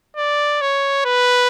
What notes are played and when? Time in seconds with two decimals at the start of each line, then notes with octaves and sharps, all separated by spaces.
0.17 D5
0.61 C#5
1.06 B4